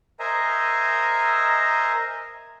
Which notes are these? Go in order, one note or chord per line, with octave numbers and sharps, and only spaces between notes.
A#4 C5 D#5 E5 G#5 A#5